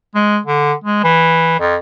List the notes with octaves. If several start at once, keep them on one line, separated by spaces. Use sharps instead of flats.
G#3
D3
G#3
E3
F2